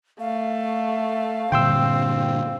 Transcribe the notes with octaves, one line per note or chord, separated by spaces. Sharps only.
A3 F5
G2 A#2 D3 C4 G5 C6 E6